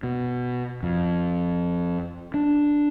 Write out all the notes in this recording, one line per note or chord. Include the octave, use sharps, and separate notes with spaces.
B2
F2
D4